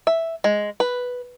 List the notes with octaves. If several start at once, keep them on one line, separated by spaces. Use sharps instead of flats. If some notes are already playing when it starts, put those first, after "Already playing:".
E5
G#3
B4